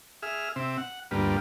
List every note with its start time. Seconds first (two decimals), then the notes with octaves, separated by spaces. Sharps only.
0.23 G#4 E5 F6
0.56 C3 C4 E5
0.78 F#5
1.11 D2 G2 G3 A#3 F4 B4